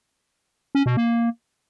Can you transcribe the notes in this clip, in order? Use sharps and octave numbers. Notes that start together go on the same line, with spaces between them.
C#4
B2
A#3